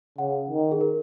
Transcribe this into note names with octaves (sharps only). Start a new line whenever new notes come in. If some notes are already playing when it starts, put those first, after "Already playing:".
C#3 F#5
D#3
G#4
A#4